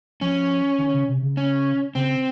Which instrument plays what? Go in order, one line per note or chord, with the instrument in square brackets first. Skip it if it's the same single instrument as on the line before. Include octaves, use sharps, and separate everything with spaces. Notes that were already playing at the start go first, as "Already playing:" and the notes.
[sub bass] F3 [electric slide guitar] C#4
[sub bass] D#3
C#3
C3
C#3
[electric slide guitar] C#4
[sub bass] C#3 [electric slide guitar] C4